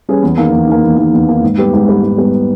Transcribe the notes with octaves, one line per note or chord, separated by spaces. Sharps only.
G3 C#4 G#4 B4
E2
D#3 A#3
E2
D#3 A#3
E2
D#3 A#3
E2
D#3 A#3
G#2
G3 B3 G4 B4
G#2
G3 B3 G4 B4
G#2
G3 B3 G4 B4